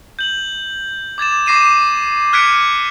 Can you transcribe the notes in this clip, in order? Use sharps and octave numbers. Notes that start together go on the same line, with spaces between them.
G6 F#7
D6 G#6 A6 E7
C#6 D6 A#6 C7 D#7 E7
F6 F#6 G#6 B6 C#7 D7